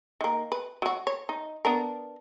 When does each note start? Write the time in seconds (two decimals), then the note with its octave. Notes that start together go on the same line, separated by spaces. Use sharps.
0.21 D#3 A#3
0.52 B4
0.82 F#3 F#4
1.07 C#5
1.29 D#4
1.65 B3 D4 A#4